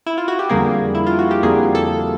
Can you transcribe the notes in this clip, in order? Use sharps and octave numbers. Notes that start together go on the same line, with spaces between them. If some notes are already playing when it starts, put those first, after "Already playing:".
E4
F4
F#4
G4
F2 D3 G3 A#3 G#4
E4
F4
F#4
G4
F2 D3 G3 A#3 G#4
A4